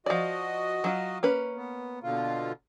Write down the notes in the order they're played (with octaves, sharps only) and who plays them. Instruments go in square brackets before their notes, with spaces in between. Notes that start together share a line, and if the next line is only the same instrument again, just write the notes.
[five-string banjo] F3 D5 [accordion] F#4 D#5
[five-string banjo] F#3 F4
A#3 C#4 B4
[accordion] B3
B2 D3 F4